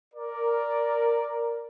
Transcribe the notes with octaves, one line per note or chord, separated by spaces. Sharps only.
A#4 D5